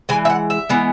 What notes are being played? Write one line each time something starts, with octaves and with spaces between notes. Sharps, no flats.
E3 G#3 G#5
E5
F#5
E5
E3 G#3 B3